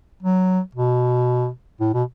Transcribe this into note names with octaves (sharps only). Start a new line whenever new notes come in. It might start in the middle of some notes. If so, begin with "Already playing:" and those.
F#3
B2
A2
B2